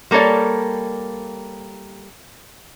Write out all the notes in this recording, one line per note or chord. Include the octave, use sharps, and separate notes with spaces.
G3 A#3 A4 C#5 D5